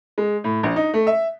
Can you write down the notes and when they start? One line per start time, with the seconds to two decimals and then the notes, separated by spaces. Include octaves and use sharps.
0.18 G#3
0.44 A2
0.63 A#1
0.76 D#4
0.94 A3
1.07 E5